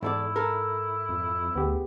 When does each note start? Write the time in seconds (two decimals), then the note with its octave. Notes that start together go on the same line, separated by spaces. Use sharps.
0.03 E2 G#2 E4 A4 D5
0.36 A4 A#4
1.09 F2
1.55 D2 B3 G4 G#4